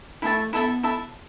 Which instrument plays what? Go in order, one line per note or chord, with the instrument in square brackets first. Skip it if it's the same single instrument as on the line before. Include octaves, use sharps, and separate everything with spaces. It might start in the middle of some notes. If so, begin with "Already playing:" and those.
[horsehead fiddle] A3 [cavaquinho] E4 A4 E5 A5
[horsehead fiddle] B3 [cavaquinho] E4 A4 E5 A5
[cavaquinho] E4 A4 E5 A5